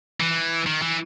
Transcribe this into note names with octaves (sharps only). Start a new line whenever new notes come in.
E3
D#3
E3